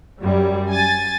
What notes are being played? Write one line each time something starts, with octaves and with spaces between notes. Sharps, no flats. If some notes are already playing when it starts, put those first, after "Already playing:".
F#2 G3
G#5 A6